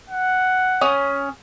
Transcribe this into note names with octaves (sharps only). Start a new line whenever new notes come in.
F#5
C#4 G#5 D#6